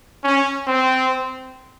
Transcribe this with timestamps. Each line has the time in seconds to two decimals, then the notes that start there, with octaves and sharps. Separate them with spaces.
0.24 C#4
0.67 C4